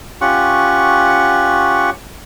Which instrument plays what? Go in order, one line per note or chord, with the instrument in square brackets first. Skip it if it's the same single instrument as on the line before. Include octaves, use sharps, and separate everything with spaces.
[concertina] C#4 F4 G4 F#5 C#6